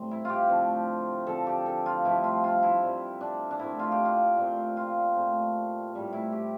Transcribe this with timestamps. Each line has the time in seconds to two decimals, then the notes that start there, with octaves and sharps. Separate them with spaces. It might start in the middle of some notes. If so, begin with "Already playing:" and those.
Already playing: A2 G3 C4
0.11 E4
0.25 F4 G4
0.49 D3 F3 A3 C4
1.27 D3 F3 C4 A4
1.47 G4
1.66 A4
1.86 F4
2.05 G2 F3 A3 E4
2.24 F4
2.44 F4
2.63 E4
2.82 C3 G3 C4
3.21 D4
3.51 D4
3.60 A#2 A3 C4 E4
3.79 F4
3.92 G4
4.05 F4
4.37 A#2 A3 C4
4.77 F4
5.16 A#2 A3 C4
5.92 A2 G3 C4
6.13 E4
6.32 G4